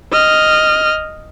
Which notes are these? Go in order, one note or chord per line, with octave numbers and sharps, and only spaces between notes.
D#5 F6